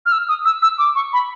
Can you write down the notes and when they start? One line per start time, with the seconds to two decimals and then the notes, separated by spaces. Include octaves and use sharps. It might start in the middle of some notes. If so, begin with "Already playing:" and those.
0.06 F6
0.12 E6
0.29 D#6
0.45 E6
0.62 E6
0.78 D6
0.95 C#6
1.13 B5